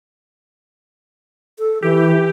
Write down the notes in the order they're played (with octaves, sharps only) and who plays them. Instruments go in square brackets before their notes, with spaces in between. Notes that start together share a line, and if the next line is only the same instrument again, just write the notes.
[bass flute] A4
[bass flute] E3 [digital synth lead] G4